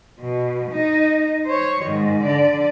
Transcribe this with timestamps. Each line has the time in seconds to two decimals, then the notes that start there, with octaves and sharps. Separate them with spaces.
0.20 B2
0.71 D#4
1.45 C5 C#5
1.83 G#2 D#3
2.24 D3 D5